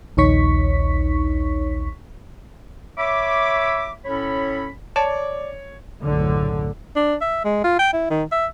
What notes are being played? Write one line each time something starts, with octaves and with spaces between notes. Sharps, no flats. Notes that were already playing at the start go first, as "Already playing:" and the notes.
A#1 D#2 D#4 C#5 C#6 B6
C#5 E5 B5 D6
A2 C#4 A4 C#5 B5
C#5 D5 A5
F#1 B1 A2 D3
D4
E5
G#3
F4
G5
E4
D#3
E5